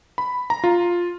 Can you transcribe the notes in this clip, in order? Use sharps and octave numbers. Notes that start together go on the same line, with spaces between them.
B5
A#5
F4